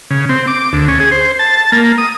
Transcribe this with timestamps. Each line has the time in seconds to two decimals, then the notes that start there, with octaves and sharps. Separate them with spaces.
0.10 C#3
0.29 C4
0.47 D6
0.73 D2
0.88 C#4
1.00 G#4
1.11 C5
1.39 A5
1.72 A#3
1.98 D#6